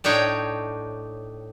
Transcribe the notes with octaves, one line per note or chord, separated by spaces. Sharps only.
A2 D4 D#4 C#5 G5